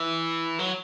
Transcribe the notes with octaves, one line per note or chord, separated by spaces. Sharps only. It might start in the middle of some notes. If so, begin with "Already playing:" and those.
Already playing: E3
F#3